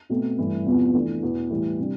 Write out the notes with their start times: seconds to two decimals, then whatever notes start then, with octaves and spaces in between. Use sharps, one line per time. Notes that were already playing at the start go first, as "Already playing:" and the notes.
0.09 B2 A3 C4
0.38 G2 E3 A3 E4
0.66 E2 C3 F3 B3
0.94 E3 A3 D4
1.22 E2 B2 B3
1.50 A2 E3 G3 B3 E4
1.79 C3 G3 D4